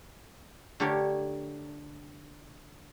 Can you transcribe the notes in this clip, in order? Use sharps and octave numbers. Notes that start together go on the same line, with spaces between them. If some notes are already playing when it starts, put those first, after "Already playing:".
D3 A3 G4 A#4 C#5